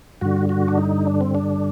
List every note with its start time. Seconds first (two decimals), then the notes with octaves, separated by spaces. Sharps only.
0.21 G2 D3 F#4
0.49 F#4
0.68 D4
0.78 D#4
1.07 D4
1.21 C4
1.35 D4